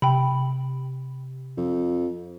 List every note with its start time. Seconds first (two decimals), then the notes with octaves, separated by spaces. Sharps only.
0.02 C3 G5 B5
1.57 F2